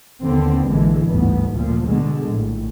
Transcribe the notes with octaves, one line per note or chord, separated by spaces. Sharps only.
D#2 D3 B3 C4
A#1 D3 E3 G#3
G1 D2 G#2 B3
D2 A#2 F3
B2 D3 G#3
A#1 A2